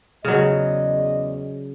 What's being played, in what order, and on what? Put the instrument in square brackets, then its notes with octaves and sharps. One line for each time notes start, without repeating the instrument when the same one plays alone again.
[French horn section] E2 D5 D#5 [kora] C#3 F#3